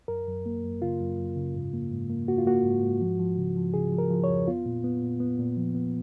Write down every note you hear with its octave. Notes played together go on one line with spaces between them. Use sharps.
F#2 A#4
F#2
A#3
F#2
C#3 F4
F#2
F#2
C#3
G#2
A#3
G#2
A#3
A#3 F#4
F4
A#3 F#4
G#2
G#2
F3
F3
C#3
F3
C#3 G#4
F3
A#4
F3
C#5
F2
B3 F4
A#2
B3
A#2
B3
A#2
F3
B3